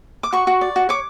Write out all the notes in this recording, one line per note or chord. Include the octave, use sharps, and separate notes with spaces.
D6
F#4 C#6
F#4
D5
F#4
C#5 D6